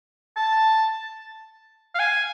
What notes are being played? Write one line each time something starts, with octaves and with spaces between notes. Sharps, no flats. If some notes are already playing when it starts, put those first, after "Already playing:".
A5
F5
G#5